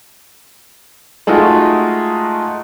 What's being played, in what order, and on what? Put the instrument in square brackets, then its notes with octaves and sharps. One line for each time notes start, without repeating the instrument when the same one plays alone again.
[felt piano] G#3 A3 D#4 F4 F#4